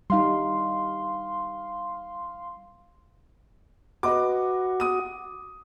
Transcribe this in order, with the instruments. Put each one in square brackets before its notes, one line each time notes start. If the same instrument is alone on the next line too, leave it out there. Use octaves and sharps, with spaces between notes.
[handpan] G3 D#4 [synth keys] F5 C6
[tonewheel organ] F#4 [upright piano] B4 D#5 D6
[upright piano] D#6 D#7